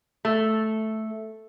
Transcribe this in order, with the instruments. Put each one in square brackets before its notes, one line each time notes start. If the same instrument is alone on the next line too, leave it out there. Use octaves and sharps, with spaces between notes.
[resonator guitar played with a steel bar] A3